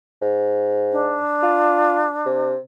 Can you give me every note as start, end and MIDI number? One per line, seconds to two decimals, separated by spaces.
0.22 1.17 44
0.92 2.54 62
1.43 2.05 65
2.26 2.57 48